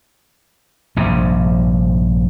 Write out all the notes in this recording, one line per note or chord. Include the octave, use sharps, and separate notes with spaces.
A#1 G2 C3